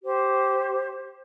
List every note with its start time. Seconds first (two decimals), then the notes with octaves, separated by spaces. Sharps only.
0.03 G4 C5